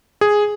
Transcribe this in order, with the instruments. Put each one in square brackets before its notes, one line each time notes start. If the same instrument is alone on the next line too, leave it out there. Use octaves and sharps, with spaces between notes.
[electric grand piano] G#4